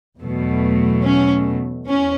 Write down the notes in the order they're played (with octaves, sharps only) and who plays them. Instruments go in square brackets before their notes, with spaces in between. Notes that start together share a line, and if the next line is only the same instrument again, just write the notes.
[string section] E2 B2 F#3 A3
C#4
E2 C#4